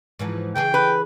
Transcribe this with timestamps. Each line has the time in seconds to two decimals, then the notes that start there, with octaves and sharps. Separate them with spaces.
0.19 G#2 E3 F3
0.56 C#3 E3 G#4 G5
0.74 B4